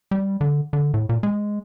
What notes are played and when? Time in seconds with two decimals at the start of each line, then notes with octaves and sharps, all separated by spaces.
0.11 G3
0.41 D3
0.73 D3
0.94 A2
1.09 A#2
1.23 G#3